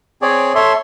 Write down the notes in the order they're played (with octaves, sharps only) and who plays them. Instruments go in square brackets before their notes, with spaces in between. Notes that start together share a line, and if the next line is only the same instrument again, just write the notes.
[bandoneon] C4 G#4 C#5 D5
A4 C#5 E5 C6